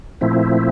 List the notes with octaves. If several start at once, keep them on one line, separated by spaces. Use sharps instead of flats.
A#2 F3 A3 C4 E4